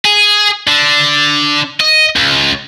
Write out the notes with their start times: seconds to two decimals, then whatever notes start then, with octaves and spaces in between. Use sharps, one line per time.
0.05 G#4
0.67 D3
1.80 D#5
2.16 C#2